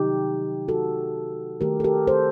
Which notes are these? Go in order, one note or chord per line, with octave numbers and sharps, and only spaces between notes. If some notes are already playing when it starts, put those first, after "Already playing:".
Already playing: C3 D#3 F#3 D#4 G4
F#4 A4
D#3 A3 G4 A#4
A4
G4 A#4
A4 C5